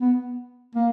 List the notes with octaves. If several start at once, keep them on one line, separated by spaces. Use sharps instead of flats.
B3
A#3